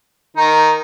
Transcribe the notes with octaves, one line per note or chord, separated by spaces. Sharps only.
D#3 D#4